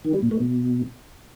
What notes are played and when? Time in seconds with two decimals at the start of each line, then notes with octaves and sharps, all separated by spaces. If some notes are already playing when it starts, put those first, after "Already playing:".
0.05 D#3
0.13 G3
0.22 A#2
0.31 A3
0.40 B2